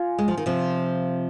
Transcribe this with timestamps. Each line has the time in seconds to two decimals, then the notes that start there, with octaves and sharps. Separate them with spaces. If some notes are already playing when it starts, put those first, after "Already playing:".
Already playing: F4 G#5
0.18 G#3
0.28 F3
0.37 D#3
0.46 C3 F3